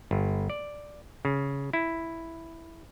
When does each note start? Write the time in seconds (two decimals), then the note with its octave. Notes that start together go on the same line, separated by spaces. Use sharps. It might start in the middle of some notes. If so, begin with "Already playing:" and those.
0.11 G1
0.50 D5
1.25 C#3
1.73 E4